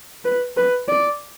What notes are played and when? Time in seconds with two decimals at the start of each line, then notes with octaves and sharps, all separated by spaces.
0.25 B4
0.57 B4
0.88 D5